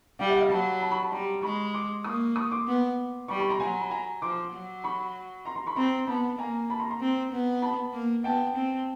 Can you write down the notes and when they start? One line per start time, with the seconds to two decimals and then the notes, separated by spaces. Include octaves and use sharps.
0.19 G3 F5 G5
0.30 E5 F#5
0.40 D#5 F5
0.50 F#3 A5 B5
0.81 A5 B5
0.91 B5 C#6
1.02 A5 B5
1.12 G3 A#5 C6
1.42 G#3 B5 C#6
1.74 C6 D6
2.04 A#3 C#6 D#6
2.36 C#6 D#6
2.51 C6 D6
2.67 B3
3.28 G3 B5 C#6
3.40 B5 C#6
3.49 A#5 C6
3.60 F#3 G#5 A#5
3.81 B5
3.90 G#5 A#5
4.22 F3 C6 D6
4.53 F#3
4.84 B5 C#6
5.45 A#5 C6
5.56 A#5 C6
5.67 B5 C#6
5.76 C4 A#5 C6
6.07 B3 A5 B5
6.38 A#3 G#5 A#5
6.70 A5 B5
6.80 A#5 C6
6.90 A#5 C6
7.01 C4
7.32 B3
7.62 A5 B5
7.93 A#3
8.24 B3 G5 A5
8.56 C4